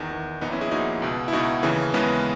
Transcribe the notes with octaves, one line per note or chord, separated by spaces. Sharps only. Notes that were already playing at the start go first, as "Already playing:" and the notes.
Already playing: E2 D#3
E2 D#3
A#1 A#2 B3 D#4
C#4 E4
E4 G#4
A#1 A#2 D#4 F#4
C#2 B2
E4
C#2 B2 D#4 F#4
D#2 C#3 E3
D#2 C#3 E3 G#3 B3